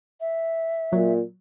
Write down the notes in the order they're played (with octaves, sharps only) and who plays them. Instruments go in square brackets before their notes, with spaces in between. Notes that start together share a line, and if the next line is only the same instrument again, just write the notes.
[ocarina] E5
[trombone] A#2 [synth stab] F#3